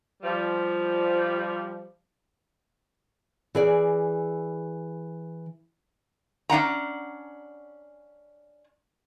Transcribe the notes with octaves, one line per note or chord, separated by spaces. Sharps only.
F3 G3
E3 G#4 D5
C#4 D4 F#5 A#5